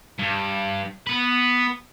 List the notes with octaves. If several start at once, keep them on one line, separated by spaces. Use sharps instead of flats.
G2
B3 B4